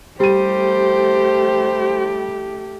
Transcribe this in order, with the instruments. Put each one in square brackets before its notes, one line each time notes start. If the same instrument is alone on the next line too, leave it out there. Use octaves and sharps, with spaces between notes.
[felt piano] G3 D#7 [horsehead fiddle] A3 G4 [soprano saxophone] C5